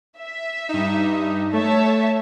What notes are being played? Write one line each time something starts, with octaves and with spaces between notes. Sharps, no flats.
E5
G2 D#4
A3 C#5 E5 A5